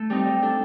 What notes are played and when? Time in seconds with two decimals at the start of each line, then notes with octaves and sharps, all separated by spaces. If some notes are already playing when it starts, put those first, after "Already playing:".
Already playing: A3 A4
0.10 G3 C4 D#4
0.26 G3
0.42 D4 A4